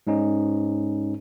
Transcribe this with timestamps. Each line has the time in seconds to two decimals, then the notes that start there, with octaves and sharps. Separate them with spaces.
0.07 G#2 G#3 C#4 D#4